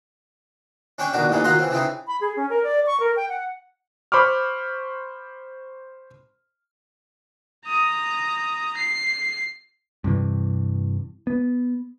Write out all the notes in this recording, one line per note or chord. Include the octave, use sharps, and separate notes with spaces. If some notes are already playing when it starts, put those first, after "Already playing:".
C#4 D4 C#5 G5 C#6
B2 D#3 D4 F#4
A1 D#2 D#3 E3 G#3
D#3 F#3 F4 F#5 A#5 C6
E3 C4
C#3 E3 C4 D#4
B5
G#4
C#4
A#4
D5
C#6
A#4
G5
F#5
C5 B5 C#6 D6 F6
A#5 D#6
C7
G2 C3 E3
B3